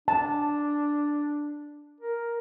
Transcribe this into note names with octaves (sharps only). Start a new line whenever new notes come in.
D4 A5
A#4